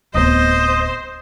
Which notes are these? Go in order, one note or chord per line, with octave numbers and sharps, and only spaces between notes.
D1 B3 C5 D#5